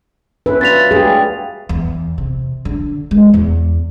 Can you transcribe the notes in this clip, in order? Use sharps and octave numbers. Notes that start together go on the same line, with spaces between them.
C#4 E4 B4
F#3 F4 D5 A6 B6 F7
G2 G3 A3 G#4
E2
C3
D3
G#3
E2